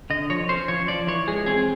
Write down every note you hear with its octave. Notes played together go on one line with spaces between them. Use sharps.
D3 D#5
F3 C#5
C#4 C5
F3 C#5
F3 D5
E3 C#5
G#3 G#4
C4 G#4